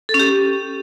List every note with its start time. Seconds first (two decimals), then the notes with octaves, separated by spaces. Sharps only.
0.09 A4
0.14 C#4
0.19 G4